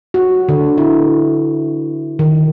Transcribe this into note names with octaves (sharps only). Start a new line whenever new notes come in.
F#4
D3
E4
D#3